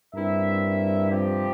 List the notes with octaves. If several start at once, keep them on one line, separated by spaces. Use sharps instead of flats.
G2 C4 E4 A#4 E5
C3 F3 C4 G4